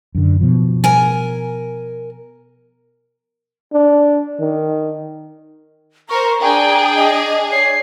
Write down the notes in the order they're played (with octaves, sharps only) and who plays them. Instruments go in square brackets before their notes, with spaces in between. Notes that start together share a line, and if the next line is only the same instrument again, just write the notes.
[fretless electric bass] F#2 D3
B2 F3
[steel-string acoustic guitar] A#4 G#5
[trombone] D4
D#3
[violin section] A#4 C5 [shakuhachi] A#5 [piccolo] C#6
[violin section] D4 G#4 [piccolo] G5
[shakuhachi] D#5
[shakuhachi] C#5 [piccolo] C7